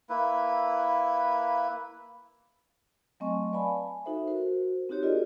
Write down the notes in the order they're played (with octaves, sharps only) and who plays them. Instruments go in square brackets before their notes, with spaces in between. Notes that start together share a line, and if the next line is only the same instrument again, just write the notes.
[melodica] A#3 E4 B4
[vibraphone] F#3 A3 C4 D#5 G#5 C#6
B4 D5 F5 G#5 A5 B5
D#4 F#4 A4 C5 E5
F#4 A#4 C5
C4 D#4 F#4 G4 C#5
F4 G#4 A#4 D5 D#5